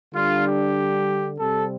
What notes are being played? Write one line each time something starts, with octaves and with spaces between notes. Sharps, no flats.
D3 G3 D4 F4
G4
C3 G3 C4 A4